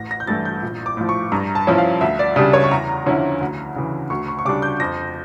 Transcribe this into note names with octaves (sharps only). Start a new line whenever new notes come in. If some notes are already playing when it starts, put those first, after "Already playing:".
Already playing: A1 A#6
A#6
G6
G2 E3 A3 E4 A6
G6
A#1
D6
A2 F3
C#6
G2 A#5
A5
F3 C#4 E4
F5
D2 E5
D5
C#3 G3 D4 D5
C#5
C#6
E2 A#5
D3 F3 C#4 E4
D2
C#3 E3
D2 C#6
C#6
C#6
C#3 G3 D4 D6
G6
F2 A#6